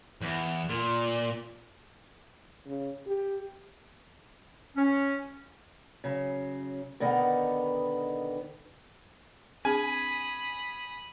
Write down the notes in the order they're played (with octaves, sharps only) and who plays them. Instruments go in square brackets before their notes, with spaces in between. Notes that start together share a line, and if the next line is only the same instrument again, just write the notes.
[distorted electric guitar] E2
A#2
[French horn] C#3
G4
[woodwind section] C#4
[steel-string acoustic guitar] C#3 F#3
B2 D3 D#3 B3 D#4
[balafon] C4 D4 G#4 [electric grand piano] G#5 [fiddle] B5 D#6